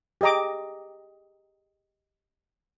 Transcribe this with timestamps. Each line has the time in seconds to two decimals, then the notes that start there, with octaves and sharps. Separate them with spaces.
0.21 G4 G#4 D#5 A#5 D6